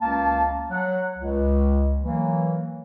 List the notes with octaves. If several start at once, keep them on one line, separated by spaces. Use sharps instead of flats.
C#2 A#3 C#4 A5
F#3 F#5
C#2
E3 F#3 A#3